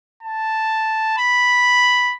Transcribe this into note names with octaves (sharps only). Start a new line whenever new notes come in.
A5
B5